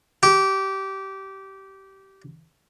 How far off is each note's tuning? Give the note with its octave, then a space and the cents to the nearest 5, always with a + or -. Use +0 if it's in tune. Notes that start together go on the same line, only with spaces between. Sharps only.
G4 -20